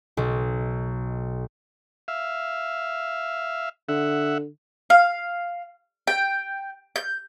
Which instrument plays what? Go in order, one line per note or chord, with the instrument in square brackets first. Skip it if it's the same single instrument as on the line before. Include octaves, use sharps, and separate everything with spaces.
[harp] B1
[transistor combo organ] E5 F5
[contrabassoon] D3 [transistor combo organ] E5 F#5
[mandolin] F5
G5
G6